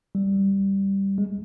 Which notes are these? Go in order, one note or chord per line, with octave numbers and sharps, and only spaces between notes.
G3
G#3